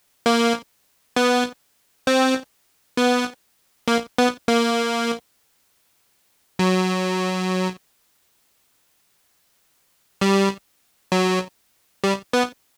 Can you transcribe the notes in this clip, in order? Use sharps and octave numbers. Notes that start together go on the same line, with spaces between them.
A#3
B3
C4
B3
A#3
B3
A#3
F#3
G3
F#3
G3
B3